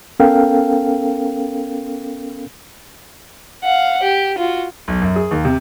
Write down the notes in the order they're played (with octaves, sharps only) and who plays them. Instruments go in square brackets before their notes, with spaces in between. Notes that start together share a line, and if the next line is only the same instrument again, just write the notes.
[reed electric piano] B3 C#4 A4 A#4 F5 G5
[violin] F5 F#5
G4
F4 F#4
[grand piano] B1
F#2
G#4
D#2
C3